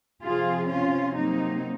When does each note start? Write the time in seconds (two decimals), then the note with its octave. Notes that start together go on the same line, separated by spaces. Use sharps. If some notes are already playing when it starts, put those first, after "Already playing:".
0.23 C3 F3 C4 F4 G#4
0.68 C#4 F4
1.14 C3 F#3 A#3 C4 D#4